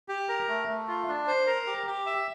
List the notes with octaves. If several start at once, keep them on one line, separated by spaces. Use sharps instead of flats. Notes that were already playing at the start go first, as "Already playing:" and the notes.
G4
A#4
A3
A3
F4
D4
C5
A#4
G4
G4
E5